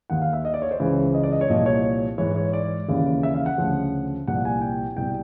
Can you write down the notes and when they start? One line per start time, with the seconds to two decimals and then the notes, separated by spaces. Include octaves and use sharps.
0.10 D#2 D#3 F#5
0.22 F5
0.33 E5
0.45 D#5
0.54 D5
0.62 C#5
0.71 C5
0.80 C#2 C#3 E3
1.14 D#5
1.23 D5
1.32 D#5
1.41 C#5
1.49 C2 A#2 F3 D#5
1.66 C#5
2.18 G#2 E3 C#5
2.36 C#5
2.53 D5
2.88 D#2 C#3 E3
3.23 E5
3.35 F5
3.46 F#5
3.58 D2 C#3 F3
4.28 C2 A#2 F3 F#5
4.45 G#5
4.61 G5
4.97 C2 B2 G5